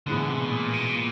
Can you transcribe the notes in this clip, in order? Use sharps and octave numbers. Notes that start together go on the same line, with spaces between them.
A2 D3 E3 G#3 B3
C3
B2
A#2
B2
A#2